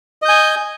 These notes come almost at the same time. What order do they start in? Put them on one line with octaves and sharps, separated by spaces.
D#5 G6 G#5